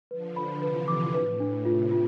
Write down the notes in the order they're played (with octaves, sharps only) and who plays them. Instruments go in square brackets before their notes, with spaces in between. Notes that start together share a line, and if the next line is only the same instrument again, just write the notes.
[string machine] D3 F3 [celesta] B4
[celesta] B5
[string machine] C3 E3 [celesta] B4
[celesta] D6
[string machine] A2 [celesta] B4
[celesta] D4
[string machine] C3 [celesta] F4
[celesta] F4